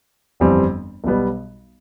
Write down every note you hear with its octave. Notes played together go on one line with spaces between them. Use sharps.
G1 F2 E3 G3 C4
B1 B2 G3 B3